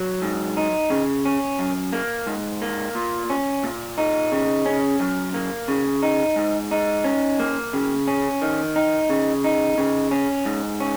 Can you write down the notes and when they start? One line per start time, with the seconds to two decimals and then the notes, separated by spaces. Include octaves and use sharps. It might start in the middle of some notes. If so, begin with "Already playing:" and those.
Already playing: F#3
0.22 G#2
0.57 D#4
0.90 C#3
1.25 C#4
1.59 F#2
1.93 A#3
2.27 G#2
2.62 A#3
2.95 A#2
3.30 C#4
3.64 A#2
3.98 D#4
4.32 C#3
4.66 C#4
5.00 F#2
5.34 A#3
5.68 C#3
6.03 D#4
6.36 G#2
6.71 D#4
7.04 C#4
7.40 A#3
7.73 C#3
8.07 C#4
8.42 D#3
8.76 D#4
9.09 C#3
9.44 D#4
9.78 C#3
10.11 C#4
10.45 G#2
10.80 C#4